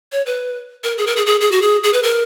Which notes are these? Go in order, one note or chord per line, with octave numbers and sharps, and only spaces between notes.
C#5
B4
A#4
G#4
A#4
G#4
G#4
G#4
F#4
G#4
G#4
B4
A#4